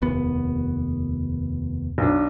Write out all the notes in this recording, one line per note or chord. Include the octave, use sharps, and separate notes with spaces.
F1 D#2 B3
B1 D4